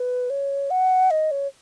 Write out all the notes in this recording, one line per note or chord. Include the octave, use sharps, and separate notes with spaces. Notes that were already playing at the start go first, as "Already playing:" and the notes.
Already playing: B4
C#5
F#5
D#5
C#5